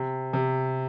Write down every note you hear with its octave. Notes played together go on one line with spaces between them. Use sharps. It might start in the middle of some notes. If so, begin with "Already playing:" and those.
Already playing: C3
C3